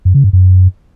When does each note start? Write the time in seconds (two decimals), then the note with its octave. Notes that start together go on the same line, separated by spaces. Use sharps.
0.05 F#2
0.14 C#3
0.24 G2
0.33 F#2